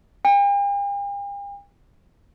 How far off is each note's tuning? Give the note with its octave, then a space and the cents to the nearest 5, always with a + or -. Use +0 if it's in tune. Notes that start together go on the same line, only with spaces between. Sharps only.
G5 +45